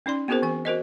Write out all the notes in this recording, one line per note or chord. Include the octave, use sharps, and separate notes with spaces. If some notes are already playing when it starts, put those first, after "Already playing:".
C#4 D#4 D5 C6
B3 C4 F#4 G#4 A#4 C5
E3 G#5
F#4 A#4 C5 D#5